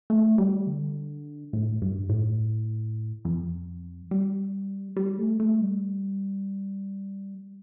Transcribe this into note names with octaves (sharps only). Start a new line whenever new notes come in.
A3
G3
D3
A2
G2
A2
F2
G3
G3
A3
A3
G3